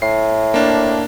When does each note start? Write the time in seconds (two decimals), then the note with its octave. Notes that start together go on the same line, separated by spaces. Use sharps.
0.02 A2 C7
0.54 A#3 D4